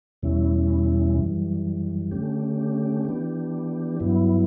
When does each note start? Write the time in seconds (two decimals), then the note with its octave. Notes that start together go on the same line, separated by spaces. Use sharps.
0.23 E2 B2 G3 C#4 E4
1.16 F#2 E3 G3
2.11 D3 A3 C#4 G4
3.05 E3 B3 D4 G4
4.00 G2 F#3 B3 E4